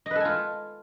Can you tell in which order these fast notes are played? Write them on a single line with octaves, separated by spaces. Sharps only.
D#5 B4 A4 G#5 F4